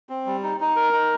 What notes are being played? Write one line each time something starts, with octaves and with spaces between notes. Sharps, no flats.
C4
G3
D#4
D#4
A#4
D#4